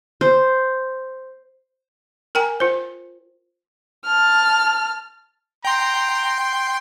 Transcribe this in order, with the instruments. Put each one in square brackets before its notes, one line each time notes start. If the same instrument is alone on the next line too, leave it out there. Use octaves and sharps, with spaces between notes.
[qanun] C5
[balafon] A#4 G5 G#5 A#5
F4 C5
[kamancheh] A5 F6
[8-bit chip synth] G5 C6 [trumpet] A#5